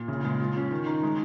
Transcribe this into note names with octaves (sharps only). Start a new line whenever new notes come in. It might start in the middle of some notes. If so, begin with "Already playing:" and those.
Already playing: A#2
C#3
G#3
F4
C#4
D#3
D#4
G#3